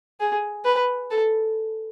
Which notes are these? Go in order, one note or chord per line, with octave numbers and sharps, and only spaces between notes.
G#4
B4
A4